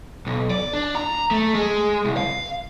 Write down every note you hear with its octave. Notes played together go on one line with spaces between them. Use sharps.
B1
D5
D4
A#5
A3
G#3
C2
F5